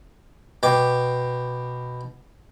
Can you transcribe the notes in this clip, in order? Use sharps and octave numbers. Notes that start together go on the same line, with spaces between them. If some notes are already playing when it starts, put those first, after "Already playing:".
B2 G5 D6